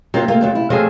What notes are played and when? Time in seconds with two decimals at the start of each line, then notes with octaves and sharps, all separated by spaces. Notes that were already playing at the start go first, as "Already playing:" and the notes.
0.14 C3 F#3 A#3 F4
0.28 A3 A#3 F4
0.41 F2 F#3 A3
0.55 E4
0.70 C3 F3 F#3 A3 G#4 C5 D#5